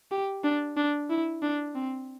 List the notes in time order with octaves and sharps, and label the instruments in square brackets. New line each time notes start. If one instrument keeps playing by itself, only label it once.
[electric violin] G4
D4
D4
E4
D4
C4